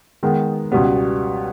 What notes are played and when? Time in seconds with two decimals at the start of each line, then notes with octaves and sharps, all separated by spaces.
0.23 D#3 G#3 B3
0.72 C#2 B2 G3 B3